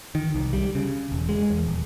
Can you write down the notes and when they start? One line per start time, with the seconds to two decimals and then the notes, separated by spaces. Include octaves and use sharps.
0.15 D#3
0.34 C2
0.53 G3
0.75 C#3
1.12 E1
1.29 G#3
1.50 E2
1.66 D#1